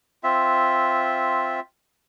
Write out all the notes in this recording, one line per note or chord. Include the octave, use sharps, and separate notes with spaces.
C4 F4 E5